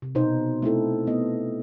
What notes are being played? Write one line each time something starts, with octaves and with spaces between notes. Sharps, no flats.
C3
B2 C4 D#4 C5
A3 C4 E4 A4
A3 B3 D#5